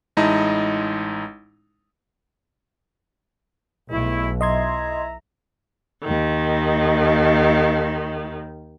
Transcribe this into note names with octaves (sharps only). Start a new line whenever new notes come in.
A1 G#3 D#4 E4 D#5 A5
B1 G#3 A3 E4
E4 D#5 E5 A#5 C6 G#6
D#2 D#3